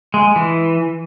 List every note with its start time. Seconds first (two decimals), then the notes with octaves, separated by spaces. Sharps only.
0.14 G#3
0.36 E3